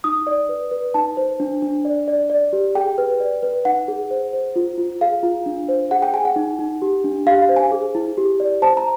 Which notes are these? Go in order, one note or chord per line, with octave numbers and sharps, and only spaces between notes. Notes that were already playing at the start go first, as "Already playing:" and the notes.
D#4 D#6
D5
B4
B4
D#4 A5
C5
D4
D4
D5
D5
D5
G4
G#4 G5
B4
D5
B4
D#4 F#5
G#4
C5
C5
F4
F4
G#4 F5
F4
D4
C5
G#4 F#5
G5
G#4 G#5
F#5
D#4
D#4
G4
D4
G4 F5
F5
C5
G#5
G#4
E4
G4
D5
C5 A5
A#5